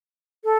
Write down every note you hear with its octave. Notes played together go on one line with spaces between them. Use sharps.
A4